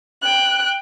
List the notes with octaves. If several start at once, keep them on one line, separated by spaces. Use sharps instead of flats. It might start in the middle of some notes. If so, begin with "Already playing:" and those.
G5 F#6